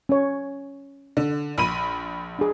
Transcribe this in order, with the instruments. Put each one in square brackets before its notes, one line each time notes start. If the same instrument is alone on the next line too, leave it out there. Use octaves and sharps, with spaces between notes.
[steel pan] C#4 C#5
[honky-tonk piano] D3
A#1 B5 D#7
[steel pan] D4 G#4